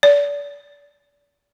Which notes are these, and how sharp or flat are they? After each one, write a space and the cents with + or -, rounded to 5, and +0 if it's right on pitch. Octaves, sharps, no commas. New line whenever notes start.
D5 -35